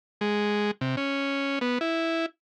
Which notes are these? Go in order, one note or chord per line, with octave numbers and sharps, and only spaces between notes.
G#3
C3
C#4
B3
E4